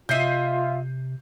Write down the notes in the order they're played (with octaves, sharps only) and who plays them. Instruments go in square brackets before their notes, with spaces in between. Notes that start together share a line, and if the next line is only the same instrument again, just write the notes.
[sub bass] C3 [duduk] F4 [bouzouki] D#5 E5 [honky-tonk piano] G6 C7 D#7